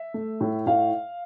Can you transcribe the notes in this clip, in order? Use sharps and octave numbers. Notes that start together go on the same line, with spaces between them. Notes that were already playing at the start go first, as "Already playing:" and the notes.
Already playing: E5
A3
A2
A2 F5